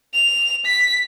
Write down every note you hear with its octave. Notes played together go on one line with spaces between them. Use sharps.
F7
B6